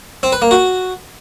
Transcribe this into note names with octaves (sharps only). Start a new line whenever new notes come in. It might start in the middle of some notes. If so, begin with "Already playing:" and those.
C4
B4
A#3
F#4